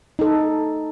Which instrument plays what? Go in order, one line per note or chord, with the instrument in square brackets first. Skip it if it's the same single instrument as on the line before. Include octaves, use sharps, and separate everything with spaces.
[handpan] D#4 A4